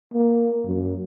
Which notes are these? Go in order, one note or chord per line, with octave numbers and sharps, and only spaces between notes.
A#3
F#2